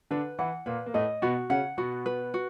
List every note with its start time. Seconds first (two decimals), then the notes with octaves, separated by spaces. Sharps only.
0.11 D3 D4 B4
0.39 E3 E4 F#5
0.66 A#2 A#3 B4
0.86 A#3
0.94 A2 A3 D#5
1.22 B2 B3 F#4
1.50 C#3 C#4 F#5
1.77 B2 B3 F#4
2.06 B4
2.34 F#4